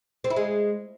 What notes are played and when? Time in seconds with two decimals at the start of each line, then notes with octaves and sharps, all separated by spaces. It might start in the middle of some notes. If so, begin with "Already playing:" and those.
0.24 C4
0.30 E4
0.36 G#3